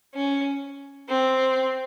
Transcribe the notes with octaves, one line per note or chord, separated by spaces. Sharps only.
C#4
C4